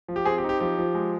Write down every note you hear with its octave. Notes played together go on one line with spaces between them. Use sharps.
F3
G4
C4 G#4
G4
D#4
G4
F3 G4
F3
G#3